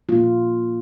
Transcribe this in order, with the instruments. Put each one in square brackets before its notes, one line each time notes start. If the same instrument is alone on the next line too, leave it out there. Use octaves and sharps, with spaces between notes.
[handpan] A#2 F3 A#3 F4